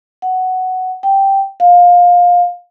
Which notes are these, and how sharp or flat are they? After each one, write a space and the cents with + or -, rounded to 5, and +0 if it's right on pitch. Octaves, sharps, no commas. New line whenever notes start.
F#5 +5
G5 -5
F5 +20